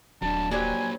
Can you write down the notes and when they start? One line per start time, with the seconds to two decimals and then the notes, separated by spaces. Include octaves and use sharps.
0.22 D#1 F#3 D4 A5
0.51 F#3 A#3 D4 G4 C5 G#5